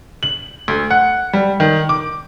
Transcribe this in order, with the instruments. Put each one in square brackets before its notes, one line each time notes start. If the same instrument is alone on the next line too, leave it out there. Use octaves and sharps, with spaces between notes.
[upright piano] F#7
D2
F#5
G3
D#3
D6